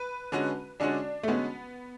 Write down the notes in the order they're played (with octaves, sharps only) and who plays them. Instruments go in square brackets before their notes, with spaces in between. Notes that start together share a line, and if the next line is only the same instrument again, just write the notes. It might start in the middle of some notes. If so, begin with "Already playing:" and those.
Already playing: [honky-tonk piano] B4
[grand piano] D3 G#3 C#4 F#4
[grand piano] D3 G#3 C#4 F#4 [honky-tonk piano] D4
[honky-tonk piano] A3
[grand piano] D3 G#3 C#4 F#4 [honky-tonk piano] B3